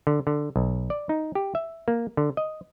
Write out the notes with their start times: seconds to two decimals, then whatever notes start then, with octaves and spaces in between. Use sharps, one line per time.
0.07 D3
0.27 D3
0.56 B1
0.90 D5
1.09 D#4
1.35 G4
1.55 E5
1.88 A#3
2.17 D3
2.37 D#5